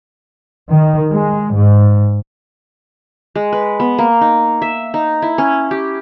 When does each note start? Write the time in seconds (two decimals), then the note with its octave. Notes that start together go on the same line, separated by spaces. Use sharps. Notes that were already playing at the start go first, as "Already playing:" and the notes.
0.69 D#3
1.12 G#3
1.55 G#2
3.35 G#3
3.52 B4
3.80 B3
3.98 A#3
4.21 D#4
4.62 E5
4.94 D#4
5.22 E4
5.38 C#4
5.71 G4